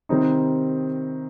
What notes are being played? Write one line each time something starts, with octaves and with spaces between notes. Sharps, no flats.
C3 D#3 G3 C4 D#4